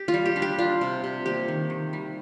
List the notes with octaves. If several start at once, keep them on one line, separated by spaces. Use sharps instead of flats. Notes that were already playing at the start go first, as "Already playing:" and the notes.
Already playing: G4
F4
G3
G4
D4
G4
D4 F4
C3
C3
A#3 G4
D#3
D#3
G3